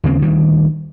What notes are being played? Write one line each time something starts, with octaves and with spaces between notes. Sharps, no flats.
D#2 C#3 C4
D2 D#3 G3